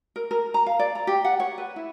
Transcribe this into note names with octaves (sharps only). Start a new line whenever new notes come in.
A#4
A#4
A#5
F5
D5
A#5
G4
F#5
C#5
B4
E4